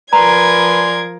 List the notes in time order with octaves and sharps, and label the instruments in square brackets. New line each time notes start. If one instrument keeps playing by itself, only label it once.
[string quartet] F3 A#4 G#6 [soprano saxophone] B4 [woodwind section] D5 G#5 C6 [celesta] A#5